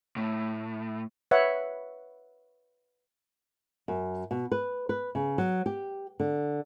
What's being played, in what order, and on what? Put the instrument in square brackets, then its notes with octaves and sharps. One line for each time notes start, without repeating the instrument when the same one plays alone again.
[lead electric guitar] A2
[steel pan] B4 C#5 E5 F#5
[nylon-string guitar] F#2
B2
B4
B4
C#3
F#3
G4
D3